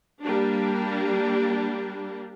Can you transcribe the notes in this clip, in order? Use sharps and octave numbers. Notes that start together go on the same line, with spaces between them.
G3 A#3 D4